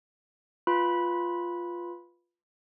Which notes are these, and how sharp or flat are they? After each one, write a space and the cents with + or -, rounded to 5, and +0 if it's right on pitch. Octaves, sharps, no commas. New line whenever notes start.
F4 +0 B4 +0 B5 -10